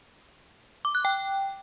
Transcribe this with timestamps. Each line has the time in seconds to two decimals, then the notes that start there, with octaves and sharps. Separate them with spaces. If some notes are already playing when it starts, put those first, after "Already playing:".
0.85 D6
0.95 F#6
1.05 G5